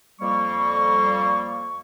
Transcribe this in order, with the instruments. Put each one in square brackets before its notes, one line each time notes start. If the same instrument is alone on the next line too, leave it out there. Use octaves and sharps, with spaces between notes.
[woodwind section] F2 G3 A#3 C#6